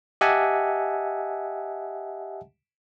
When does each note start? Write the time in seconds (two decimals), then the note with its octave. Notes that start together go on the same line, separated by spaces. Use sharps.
0.21 G4 D#5 E5 F#5 G#5 A5